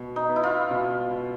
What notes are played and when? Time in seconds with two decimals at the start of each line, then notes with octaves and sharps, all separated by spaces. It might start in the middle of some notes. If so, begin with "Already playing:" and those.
Already playing: B2
0.16 D#4
0.29 B3
0.36 E4
0.43 F4
0.70 B2
1.11 B2